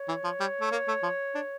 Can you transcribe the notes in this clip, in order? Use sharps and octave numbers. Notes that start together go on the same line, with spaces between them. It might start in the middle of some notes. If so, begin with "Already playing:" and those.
Already playing: C#5
E3
F3
G3
A3
A#3
A3
F3
D4